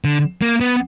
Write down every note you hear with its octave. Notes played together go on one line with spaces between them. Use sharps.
D3
A#3
B3